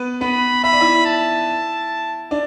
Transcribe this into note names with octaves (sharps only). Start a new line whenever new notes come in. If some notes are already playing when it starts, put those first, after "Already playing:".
Already playing: B3 B4
B3 B4 B5
E5 B5
D5
E4 E5
A5
D4 D5